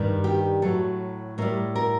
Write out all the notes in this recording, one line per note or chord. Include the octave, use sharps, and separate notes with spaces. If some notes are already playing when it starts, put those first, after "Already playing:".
Already playing: G2 D#3 G3
G4
A2 F#3 A4
A2 G3 A#4
A#4